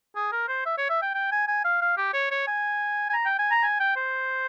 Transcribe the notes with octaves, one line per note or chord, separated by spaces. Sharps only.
G#4
A#4
C5
E5
C#5
E5
G5
G5
G#5
G#5
F5
F5
G4
C#5
C#5
G#5
G#5
A#5
G5
G#5
A#5
G#5
G5
C5